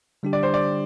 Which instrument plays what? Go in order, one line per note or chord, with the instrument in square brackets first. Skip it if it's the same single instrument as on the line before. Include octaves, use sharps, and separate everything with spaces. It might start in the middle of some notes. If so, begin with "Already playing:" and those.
[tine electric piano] D3 G3 D4 G4
[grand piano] D5
C5
D5